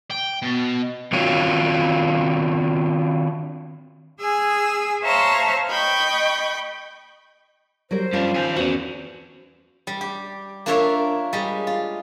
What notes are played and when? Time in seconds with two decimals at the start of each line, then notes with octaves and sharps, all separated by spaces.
0.11 G5
0.42 B2
1.12 D#3 C4 D4 F4 F#4 C#5
4.20 G#4 G#5 E6
5.02 C5 C#5 E5 F5 A5 A#5
5.69 D#5 G5 B5 C#6
7.91 F#3 G3 A#4 C5
8.13 G2 F3 C#4 D4 F4
8.36 D#3 G#5
8.56 E2 C#4 F#4
9.87 G3
10.01 G4
10.66 A#3 D4 F4 A#4 C#5 E5
11.33 G3 G#3
11.67 F4